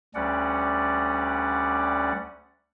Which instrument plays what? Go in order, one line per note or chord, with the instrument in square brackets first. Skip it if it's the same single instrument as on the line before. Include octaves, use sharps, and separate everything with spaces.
[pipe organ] D2 G3 C#4 D5 F#5